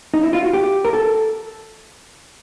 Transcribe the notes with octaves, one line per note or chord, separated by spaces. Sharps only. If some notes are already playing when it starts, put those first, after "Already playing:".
D#4
E4
F4
F#4
G4
A#4
A4